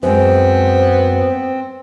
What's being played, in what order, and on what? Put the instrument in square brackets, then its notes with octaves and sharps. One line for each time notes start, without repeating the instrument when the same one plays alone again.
[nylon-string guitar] F#2 G#3 [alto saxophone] B3 [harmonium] C4 [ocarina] C5